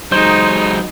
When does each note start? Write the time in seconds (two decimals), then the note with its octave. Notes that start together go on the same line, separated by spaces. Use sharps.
0.12 F#3 G#3 D#4 C5